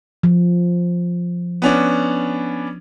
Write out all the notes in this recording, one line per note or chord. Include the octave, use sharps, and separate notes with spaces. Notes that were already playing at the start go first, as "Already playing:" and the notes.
F3
B3 C#4 D4